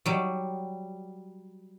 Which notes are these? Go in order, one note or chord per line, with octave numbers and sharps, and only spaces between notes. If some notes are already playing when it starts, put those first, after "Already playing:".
F#3 G3